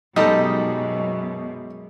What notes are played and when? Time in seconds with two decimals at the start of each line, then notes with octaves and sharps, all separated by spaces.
0.16 F#2 B2 G3 G#3 D#4 A4 D#5